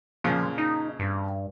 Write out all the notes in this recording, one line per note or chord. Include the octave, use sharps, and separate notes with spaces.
F2 A#2 C#3 F3
D#4
G2